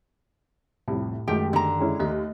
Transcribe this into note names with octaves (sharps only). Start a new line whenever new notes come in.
C2 F2 A2
F#2 D#3 G#3 A3 F#4 G4 G5
D3 A#5
G#3 C#4 E4
D#2 A3 D#5